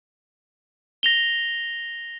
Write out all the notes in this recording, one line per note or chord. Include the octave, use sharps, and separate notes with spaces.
A#6 F7 G7